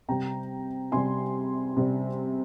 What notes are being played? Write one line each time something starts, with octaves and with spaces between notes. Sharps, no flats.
C3 G3 G5 A#5
C3 G3 G#5 C6
C3 G3